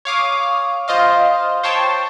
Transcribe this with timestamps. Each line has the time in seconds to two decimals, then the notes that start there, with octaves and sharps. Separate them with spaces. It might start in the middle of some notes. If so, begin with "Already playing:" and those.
0.05 C#5 F5 D6 D#6
0.88 F4 C5 D#5 F5
1.63 C5 C#5 G5 A5